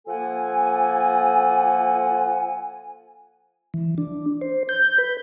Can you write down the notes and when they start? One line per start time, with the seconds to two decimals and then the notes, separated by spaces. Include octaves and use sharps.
0.07 F3 A#3 A4 F#5 G#5
3.74 E3
3.98 D4
4.41 C5
4.69 G6
4.98 B4